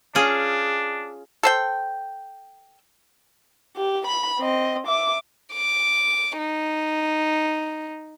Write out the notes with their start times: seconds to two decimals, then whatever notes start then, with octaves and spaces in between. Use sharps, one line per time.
0.15 C#4 D4 F4 G#4
1.43 A4 C5 G5
3.76 G4
4.06 B5
4.39 C4 D#5
4.87 E5 D6
5.54 D6
6.38 D#4